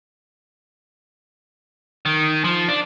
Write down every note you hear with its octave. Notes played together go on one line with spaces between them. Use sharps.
D#3
F3
D4